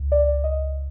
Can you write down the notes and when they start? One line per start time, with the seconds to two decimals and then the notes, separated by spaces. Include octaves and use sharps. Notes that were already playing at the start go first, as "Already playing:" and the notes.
Already playing: C#2
0.12 D5
0.44 D#5